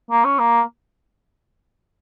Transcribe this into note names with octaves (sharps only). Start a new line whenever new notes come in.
A#3
C#4
A#3